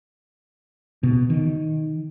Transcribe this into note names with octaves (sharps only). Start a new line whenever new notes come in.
B2
D#3